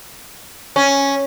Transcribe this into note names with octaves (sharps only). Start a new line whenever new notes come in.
C#4